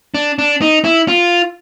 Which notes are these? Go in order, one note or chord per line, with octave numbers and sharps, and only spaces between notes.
D4
D4
D#4
E4
F4